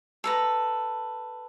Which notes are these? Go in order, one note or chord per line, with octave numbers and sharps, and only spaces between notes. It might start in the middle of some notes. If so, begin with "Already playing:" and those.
A4 B4 A#5